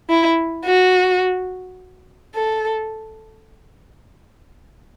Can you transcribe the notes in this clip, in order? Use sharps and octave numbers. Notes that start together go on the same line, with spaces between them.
E4
F#4
A4